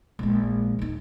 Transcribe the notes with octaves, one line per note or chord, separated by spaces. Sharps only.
A#1 G#3
D#2 D#4